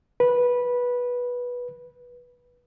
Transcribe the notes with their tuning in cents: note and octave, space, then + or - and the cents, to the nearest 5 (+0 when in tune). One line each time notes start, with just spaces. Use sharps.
B4 -10